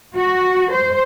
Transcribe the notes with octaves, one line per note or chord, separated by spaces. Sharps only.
F#4
C5